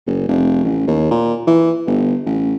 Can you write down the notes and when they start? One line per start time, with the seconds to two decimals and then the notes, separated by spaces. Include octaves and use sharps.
0.07 F#1
0.28 F1
0.65 A1
0.87 D#2
1.11 A#2
1.47 E3
1.87 G1
2.26 A1